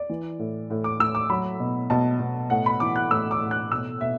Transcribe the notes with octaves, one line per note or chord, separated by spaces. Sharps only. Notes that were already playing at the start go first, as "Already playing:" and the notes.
Already playing: D5
E3
A2
A2
D6
A2 E6
D6
F#3 B5
B2
B2 A5
B2
A2 F#5
B5
E3 D6
F#6
A2 E6
D6
A2
F#6
B2 E6
B2 E5